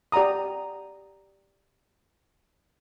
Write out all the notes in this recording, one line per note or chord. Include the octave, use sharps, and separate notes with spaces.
G4 D5 F#5 A#5 D#6